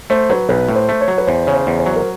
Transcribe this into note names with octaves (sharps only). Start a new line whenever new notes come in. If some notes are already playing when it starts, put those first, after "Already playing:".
A3 C5
F#3 B4
B1 B4
A2
C5
A3
C#5
F#3
B4
E2 C5
C#3 C#5
C5
E2
C5
F#3
A#4